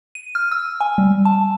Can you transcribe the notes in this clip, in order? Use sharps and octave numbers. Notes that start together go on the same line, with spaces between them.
D#7
F6
E6
G#5
G3
A5